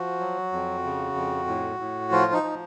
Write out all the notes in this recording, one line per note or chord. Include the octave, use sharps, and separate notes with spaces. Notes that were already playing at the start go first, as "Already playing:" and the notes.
Already playing: F3 F#4
F#3
F2
C#3
F2
A2
A2
F3 F4
D#4
F3